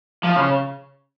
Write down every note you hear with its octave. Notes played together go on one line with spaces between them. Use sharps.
F3
C#3